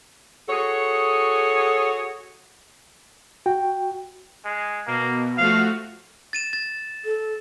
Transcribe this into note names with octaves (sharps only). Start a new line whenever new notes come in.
F#4 G#4 A4 C#5
F#4 G5
G#3
B2 A#3
F3 A3 F#4 F5
A6 D#7 E7
A6
A4